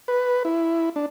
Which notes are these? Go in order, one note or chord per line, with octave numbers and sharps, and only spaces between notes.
B4
E4
D4